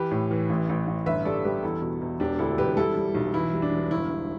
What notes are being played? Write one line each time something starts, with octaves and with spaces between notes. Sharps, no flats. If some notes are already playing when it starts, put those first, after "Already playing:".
Already playing: E3 G4 B4
A2
E3
A1
A1
A1
G1 B4 E5
G3 A4 D5
G3 G4 B4
E2 E4 A4
B2
E2
E1 D4 G4
D2 E4 A4
E1 G4 B4
G3 E4 A4
G3
B1
E3 E4
G3
D4
E1
G1 E4
G2